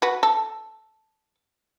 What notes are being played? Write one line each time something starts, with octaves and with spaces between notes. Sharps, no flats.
F#4 B4
A4